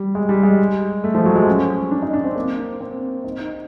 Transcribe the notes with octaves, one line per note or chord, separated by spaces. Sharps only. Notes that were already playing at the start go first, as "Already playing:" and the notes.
Already playing: G3
G#3
G3
G#3
A3
F3
F#3
G#3
C#4
D4
D#4
D4
C4
A#3
C4
D#4
D#4